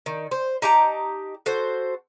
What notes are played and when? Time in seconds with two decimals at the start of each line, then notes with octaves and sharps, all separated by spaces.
0.06 D#3
0.31 C5
0.62 D#4 G4 A5 A#5
1.46 F#4 A4 C5